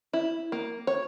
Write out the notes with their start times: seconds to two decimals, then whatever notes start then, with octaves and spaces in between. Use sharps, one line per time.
0.13 E4
0.52 A#3
0.87 C#5